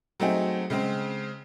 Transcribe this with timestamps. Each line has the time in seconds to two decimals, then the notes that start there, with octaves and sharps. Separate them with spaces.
0.20 F#3 A3 C4 D#4 G#4
0.70 C#3 G#3 C4